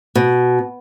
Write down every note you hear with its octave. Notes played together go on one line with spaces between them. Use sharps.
B2